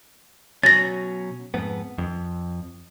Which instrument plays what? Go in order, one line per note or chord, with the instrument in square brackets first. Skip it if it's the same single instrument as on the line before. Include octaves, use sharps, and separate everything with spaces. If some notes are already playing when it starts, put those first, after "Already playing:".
[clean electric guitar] B2 F#3 C#4 [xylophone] A6 A#6
[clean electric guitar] F2 G#2 B3
F2